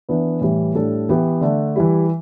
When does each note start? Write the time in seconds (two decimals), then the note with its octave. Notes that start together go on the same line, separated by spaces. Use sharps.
0.09 E3 B3 D4 B4
0.41 A2 E3 G3
0.75 A2 G3 D4 A4
1.09 E3 B3 G4 B4
1.41 D3 A3 D4
1.76 E3 G3 E4